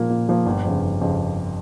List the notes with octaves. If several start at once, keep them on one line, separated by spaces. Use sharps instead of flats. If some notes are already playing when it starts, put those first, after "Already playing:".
Already playing: A#2 F3 A#3
A#2
F3 A#3
G1
F2 C#3
G1
F2 C#3